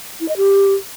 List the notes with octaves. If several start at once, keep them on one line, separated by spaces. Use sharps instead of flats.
E4
D#5
G4